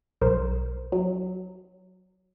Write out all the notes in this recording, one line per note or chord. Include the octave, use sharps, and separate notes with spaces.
B1 A#4 C5
F#3